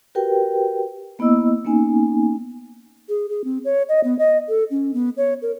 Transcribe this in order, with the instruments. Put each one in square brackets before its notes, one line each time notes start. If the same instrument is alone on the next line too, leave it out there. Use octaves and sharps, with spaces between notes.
[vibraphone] F#4 G4 A#4 B4 G5
A#3 B3 E4 D#5 E6
A#3 B3 C#4 D#4 G#5
[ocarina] G#4
G#4
C4
C#5
D#5
B3
D#5
A4
C#4
B3
C#5
A#4